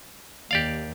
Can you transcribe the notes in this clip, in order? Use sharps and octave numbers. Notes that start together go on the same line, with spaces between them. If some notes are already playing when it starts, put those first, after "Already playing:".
D#2 G4 D5 F5